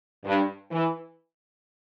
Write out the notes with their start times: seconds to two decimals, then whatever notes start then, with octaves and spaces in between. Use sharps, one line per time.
0.25 G2
0.71 E3